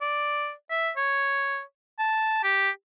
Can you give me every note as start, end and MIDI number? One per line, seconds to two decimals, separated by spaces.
0.01 0.52 74
0.70 0.91 76
0.97 1.62 73
1.99 2.40 81
2.43 2.70 67